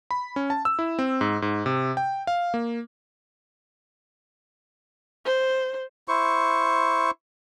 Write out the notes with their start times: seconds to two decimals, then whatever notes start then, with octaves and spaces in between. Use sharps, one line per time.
0.11 B5
0.36 C#4
0.50 A5
0.65 E6
0.79 E4
0.99 C4
1.21 G#2
1.42 G#2
1.66 C3
1.97 G5
2.27 F5
2.54 A#3
5.26 C5
6.08 E4 C5 C#6